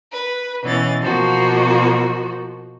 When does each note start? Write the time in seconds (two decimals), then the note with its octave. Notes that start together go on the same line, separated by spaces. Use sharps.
0.13 B4
0.64 B2 E3 C#4 A6
1.01 B2 F3 A#3 F#4